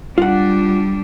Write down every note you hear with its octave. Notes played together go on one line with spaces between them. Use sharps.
G3 D4 F4 F#5